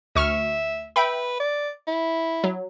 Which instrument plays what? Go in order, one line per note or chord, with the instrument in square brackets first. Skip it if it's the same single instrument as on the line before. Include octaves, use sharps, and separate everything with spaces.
[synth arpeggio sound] D2 C#6 F6 [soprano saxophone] E5
[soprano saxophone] B4 [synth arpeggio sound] E5 G5 B5
[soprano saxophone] D5
E4
[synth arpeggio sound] F#3